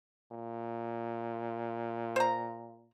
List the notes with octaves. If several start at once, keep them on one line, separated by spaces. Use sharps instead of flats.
A#2
C5 A#5